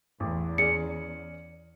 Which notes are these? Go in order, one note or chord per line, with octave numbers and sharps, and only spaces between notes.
A1 E2
C#4 G#4 D5 C#7